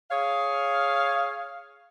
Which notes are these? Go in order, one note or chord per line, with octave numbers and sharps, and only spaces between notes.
G#4 C#5 F5